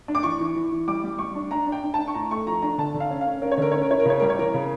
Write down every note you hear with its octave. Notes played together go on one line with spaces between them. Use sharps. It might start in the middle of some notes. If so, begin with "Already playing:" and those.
D4
D6
E3 C#6
E3
E3
E3
G3 D6
G3
G3 C#6
D4
D4 A#5
D4
G5
D4
D4 A5
C#6
A2 A#5
A3 C#6
F3 A#5
D4 A#5
D3 A5
D3
F5
C#4
F5
C#4
C#4 A#4
C#5
D3 A#4
C#4 C#5
A#4
E4 C#5
A#4
C#3 C#5
G3 A#4
C#5
E3 A#4
C#3